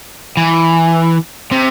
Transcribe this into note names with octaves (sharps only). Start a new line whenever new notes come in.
E3
C3